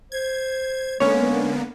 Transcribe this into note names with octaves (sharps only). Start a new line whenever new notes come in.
C5 G#6
D3 G#3 A#3 B3 C#4 C#5